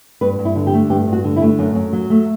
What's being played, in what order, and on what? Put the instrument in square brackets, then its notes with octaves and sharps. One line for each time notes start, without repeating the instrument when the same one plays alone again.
[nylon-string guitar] G2 B4
G2
E4
D3
G4
A3
G2 G4
G2
F#4
D3
E4
A3
F#2
F#2
F#3
A3